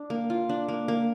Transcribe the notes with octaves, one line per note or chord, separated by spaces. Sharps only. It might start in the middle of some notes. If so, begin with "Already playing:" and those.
Already playing: D4
A#3
F4
D4
A#3
A#3